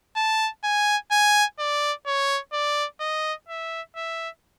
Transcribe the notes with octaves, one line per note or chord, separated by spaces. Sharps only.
A5
G#5
G#5
D5
C#5
D5
D#5
E5
E5